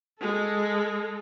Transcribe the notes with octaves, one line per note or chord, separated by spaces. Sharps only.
G#3 A4